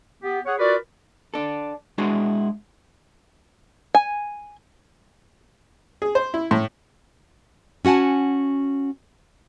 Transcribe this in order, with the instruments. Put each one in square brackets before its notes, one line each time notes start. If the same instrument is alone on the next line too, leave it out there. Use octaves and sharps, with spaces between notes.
[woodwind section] B3 G4
G#4 C#5 F#5
F4 F#4 A#4 B4 D5
[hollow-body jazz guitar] D4 A4
G#3 D4 E4 F#4 G#4
[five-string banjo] G#5
[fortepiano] G#4
C5
E4
A2
[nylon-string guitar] C#4 F#4 F#5 G#5 A5